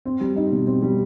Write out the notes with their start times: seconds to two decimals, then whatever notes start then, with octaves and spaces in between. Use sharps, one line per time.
0.06 C4
0.21 G3
0.36 D#4
0.52 B2
0.67 C4
0.82 G3